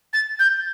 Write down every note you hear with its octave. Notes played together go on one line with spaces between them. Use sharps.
A6
G6